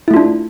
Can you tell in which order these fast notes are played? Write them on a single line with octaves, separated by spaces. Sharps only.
E4 A3 F4 D4